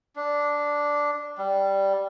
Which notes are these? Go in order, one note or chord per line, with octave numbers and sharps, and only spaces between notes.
D4
G3